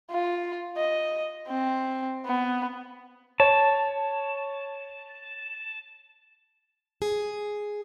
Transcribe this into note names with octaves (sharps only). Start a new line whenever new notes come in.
F4
D#5
C4
B3
C#5 A5
G#4